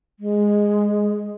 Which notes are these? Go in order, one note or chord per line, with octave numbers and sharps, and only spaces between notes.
G#3